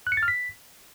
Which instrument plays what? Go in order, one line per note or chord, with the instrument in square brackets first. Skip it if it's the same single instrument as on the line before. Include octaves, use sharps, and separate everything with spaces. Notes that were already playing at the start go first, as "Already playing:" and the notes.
[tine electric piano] F#6
C#7
A6
F6
B6